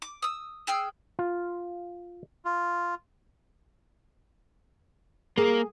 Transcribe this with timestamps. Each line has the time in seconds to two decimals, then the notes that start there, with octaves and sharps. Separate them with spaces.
0.02 D6
0.22 D#6 E6
0.67 G#4 G5 E6 F6
1.19 F4
2.45 F4
5.38 A#3 G#4 A#4